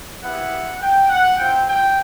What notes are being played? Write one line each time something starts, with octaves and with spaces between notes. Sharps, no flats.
B3 E4 G4 F#5
G5
F#5
C4 F4 G5
G5